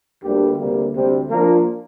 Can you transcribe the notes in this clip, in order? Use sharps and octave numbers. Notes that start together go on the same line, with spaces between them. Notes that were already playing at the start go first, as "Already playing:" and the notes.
D2 D3 G3 A#3 G4
D2 C3 G3 A#3
D2 C3 G3 C4 G4
F3 A#3 D4 F4 A#4